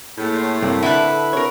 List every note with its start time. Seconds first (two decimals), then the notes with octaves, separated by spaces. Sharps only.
0.18 A2 A#3 G#4 G6
0.35 C#5 C6 C7
0.62 G2 C3 C4 A#4
0.83 D3 E4 A4 B4 F#5
1.33 A#4 C#5